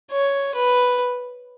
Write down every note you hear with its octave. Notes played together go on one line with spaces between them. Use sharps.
C#5
B4